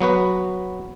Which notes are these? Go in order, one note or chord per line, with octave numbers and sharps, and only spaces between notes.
F#3 B3 F#4 B4